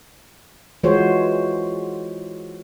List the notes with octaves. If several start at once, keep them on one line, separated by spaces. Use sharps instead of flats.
E3 G#3 F4 F#4 C5 C#5